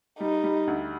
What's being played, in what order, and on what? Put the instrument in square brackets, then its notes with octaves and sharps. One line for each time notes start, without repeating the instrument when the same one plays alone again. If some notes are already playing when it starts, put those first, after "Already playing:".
[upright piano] G3 [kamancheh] D#4
[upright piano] G3
D2